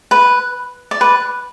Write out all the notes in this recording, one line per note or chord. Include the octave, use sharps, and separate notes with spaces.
B4
D5
B4